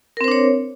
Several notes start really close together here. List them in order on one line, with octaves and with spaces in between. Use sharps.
A#4 C4 C5 D4 C#5